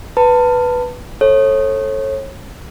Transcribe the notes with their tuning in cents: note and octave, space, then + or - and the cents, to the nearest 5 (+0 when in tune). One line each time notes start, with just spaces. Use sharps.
B4 +0 A5 +30
A4 +0 C#5 -35